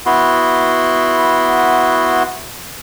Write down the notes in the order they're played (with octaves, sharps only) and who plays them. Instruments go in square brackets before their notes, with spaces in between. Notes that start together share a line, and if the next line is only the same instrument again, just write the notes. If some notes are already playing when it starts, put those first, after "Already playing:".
[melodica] B3 E4 F#4 C6